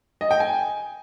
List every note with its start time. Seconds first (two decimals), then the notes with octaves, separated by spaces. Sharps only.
0.21 D#5
0.31 G5
0.40 G#5